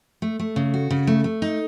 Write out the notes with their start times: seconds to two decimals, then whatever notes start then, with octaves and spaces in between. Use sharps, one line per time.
0.22 A3
0.39 A3
0.56 C#3
0.74 F#4
0.90 C#3
1.07 A3
1.24 A3
1.42 D#4